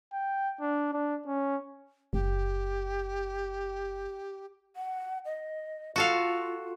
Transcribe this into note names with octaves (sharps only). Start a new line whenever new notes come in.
G5
D4
D4
C#4
F#1 G4
F#5
D#5
F4 F#4 A4 F5